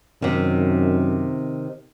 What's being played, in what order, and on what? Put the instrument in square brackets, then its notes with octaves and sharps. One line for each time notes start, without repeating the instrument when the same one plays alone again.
[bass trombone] F#2 [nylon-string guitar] C3 D#3